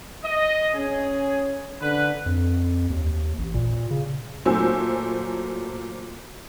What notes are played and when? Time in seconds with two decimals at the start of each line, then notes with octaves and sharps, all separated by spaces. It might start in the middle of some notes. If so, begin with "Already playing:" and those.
0.24 D#5
0.75 C#4 G#4
1.82 D3 B4
2.26 F2
2.90 D#2
3.39 A1
3.54 A#2
3.91 C#3
4.46 A#2 F#3 A3 C5 G#5 E6